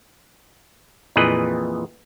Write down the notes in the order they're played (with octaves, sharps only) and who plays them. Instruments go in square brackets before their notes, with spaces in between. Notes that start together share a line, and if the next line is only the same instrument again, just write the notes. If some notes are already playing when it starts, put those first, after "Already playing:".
[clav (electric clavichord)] F2 A#2 E3 G#4 B4 D#5